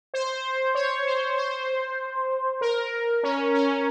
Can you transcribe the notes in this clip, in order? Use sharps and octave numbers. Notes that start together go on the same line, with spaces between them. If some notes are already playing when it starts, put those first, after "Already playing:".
C5
C#5
C5
C5
A#4
C#4
C#4